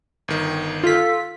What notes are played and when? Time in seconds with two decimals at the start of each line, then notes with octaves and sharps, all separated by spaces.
0.28 G1 D#3
0.83 F4 A4 B6